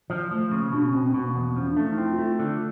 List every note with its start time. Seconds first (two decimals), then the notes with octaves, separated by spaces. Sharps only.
0.10 F3
0.31 F3 A3
0.45 A3
0.52 C#3
0.58 A#3
0.72 B2 D4
0.83 C#4
0.93 B2 C4
1.04 C4
1.14 B2 B3
1.26 A#3
1.34 E2 B3
1.56 F3 C#4
1.69 D4
1.77 A3
1.83 D#4
1.98 C4 E4
2.11 F4
2.18 A3
2.25 F4
2.39 D3